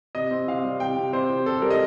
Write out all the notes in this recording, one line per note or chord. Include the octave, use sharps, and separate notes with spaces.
C3 D#5
C4
C3 F5
G3
C3 G5
C3
C3 C5
C3
C3 A4
G3 A#4
D#5